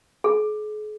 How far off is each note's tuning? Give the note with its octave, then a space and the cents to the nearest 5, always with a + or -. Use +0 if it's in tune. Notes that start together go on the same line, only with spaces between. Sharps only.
G#4 +40